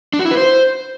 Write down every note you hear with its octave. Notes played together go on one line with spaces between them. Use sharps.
D4
F#4
E4
B4
C5